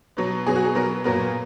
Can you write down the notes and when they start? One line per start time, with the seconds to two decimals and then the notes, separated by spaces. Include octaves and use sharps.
0.17 B2 F#3 B3
0.46 B2 F#3 B3 G#4
0.56 F#4
0.65 G#4
0.75 B2 F#3 B3 A#4
1.04 A#2 F#3 B3 A#4